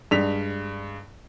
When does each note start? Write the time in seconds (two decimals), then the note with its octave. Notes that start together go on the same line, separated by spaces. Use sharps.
0.11 G2 G#3 B6 F7